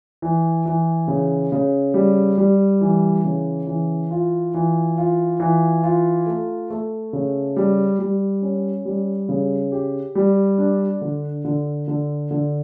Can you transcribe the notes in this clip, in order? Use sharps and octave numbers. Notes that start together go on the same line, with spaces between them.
E3
E3
C#3
C#3
G3
G3
E3
C#3
E3
F4
E3
F4
E3
F4
A3
A3
C#3
G3
G3
C#4
G3
C#3
G4
G3
D4
D3
D3
D3
D3